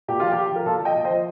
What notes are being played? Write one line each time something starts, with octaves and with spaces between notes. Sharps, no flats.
A#2 G4
F3 F4
G4
F3
F3 A#4
A#2 F4 A4
F3
D#5 G5
A#2
C5 D#5
F3